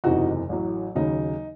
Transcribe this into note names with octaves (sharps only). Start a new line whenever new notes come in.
F#1 E2 C3 E3 D#4 F#4
A1 A2 F#3
D#2 C#3 F#3 D#4